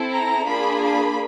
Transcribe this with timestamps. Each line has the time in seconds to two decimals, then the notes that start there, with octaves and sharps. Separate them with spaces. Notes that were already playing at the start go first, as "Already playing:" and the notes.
Already playing: C4 E4 A4
0.12 A#5
0.47 A#3 D4 F4 G#4 B5
0.83 B5